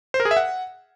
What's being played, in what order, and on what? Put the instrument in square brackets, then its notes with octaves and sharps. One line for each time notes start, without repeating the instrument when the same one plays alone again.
[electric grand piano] C5
A#4
G#4
E5
F#5